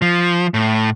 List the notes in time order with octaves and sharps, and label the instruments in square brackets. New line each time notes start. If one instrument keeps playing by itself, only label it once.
[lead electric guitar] F3
A2